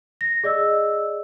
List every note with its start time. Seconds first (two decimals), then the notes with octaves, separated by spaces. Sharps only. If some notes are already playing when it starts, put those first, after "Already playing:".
0.21 A#6
0.44 G#4 D5 D#5 E6